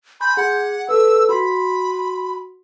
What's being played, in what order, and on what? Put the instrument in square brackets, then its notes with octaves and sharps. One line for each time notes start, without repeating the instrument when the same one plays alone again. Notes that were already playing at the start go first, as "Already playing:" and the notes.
[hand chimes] G#5 C6 G6 [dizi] B5
[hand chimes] G#4 G#6 [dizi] F#5
[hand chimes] A4 B4 [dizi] E6
[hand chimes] F#4 C6 B6 [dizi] B5